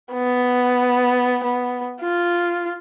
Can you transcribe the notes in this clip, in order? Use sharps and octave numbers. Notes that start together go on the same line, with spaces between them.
B3
B3
F4